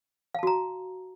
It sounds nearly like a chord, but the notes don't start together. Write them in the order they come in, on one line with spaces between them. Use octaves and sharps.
F5 A5 F#4 A#5